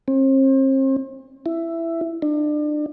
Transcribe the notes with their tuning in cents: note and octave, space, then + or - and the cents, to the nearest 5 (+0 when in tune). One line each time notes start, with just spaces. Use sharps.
C4 +40
E4 +10
D4 +35